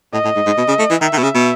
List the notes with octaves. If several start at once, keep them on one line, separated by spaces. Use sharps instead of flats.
A2 D#5
A2
G#2
G#2
B2
C#3
A3
E3
D#3 E5
D#3
B2
C#3
B2